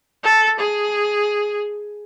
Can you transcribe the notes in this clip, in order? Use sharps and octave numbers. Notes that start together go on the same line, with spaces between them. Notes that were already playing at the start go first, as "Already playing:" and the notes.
A4
G#4